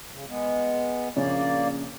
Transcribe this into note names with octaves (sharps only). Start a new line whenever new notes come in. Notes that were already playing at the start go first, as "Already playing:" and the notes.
C#3
G#3 B3
A#1 C#3 A#3 C#5 D5